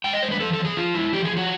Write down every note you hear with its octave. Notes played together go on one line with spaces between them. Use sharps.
G#3 G5
D#5
G#3 C5
B4
F3 A4
A4
F3
G#4
F3 F4
G#3 E4
F3 G4
G#4
F3
F#4